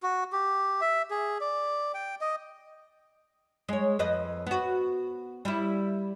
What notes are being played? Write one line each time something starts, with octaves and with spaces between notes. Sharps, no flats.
F#4
G4
E5
G#4
D5
G5
D#5
G#3 C#5
F2 B4 D#5
B3 F#4
G3 E4